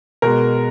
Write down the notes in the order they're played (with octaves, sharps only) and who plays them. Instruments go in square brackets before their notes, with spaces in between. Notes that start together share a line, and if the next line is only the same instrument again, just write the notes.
[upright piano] B2 G#3 A#4